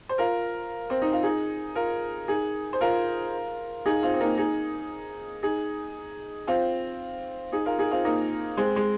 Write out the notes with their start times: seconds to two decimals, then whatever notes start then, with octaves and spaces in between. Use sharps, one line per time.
0.09 C5
0.18 F4 A#4
0.90 C4
1.02 D#4
1.13 F4
1.23 D#4 G#4
1.75 F4 A#4
2.28 D#4 G#4
2.73 C5
2.81 F4 A#4
3.86 D#4 G#4
4.03 C4 F4
4.14 C4
4.20 A#3 D#4
4.38 D#4 G#4
5.43 D#4 G#4
6.47 C4 F4
7.52 D#4 G#4
7.66 F4 A#4
7.79 D#4 G#4
7.91 C4 F4
8.05 A#3 D#4
8.57 G#3 C4
8.76 G#3